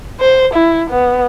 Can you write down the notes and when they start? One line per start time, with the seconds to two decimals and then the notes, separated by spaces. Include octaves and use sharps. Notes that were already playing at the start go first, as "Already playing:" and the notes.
0.20 C5
0.54 E4
0.90 B3